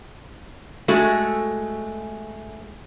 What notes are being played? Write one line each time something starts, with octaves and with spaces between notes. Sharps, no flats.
G#3 A3 F#4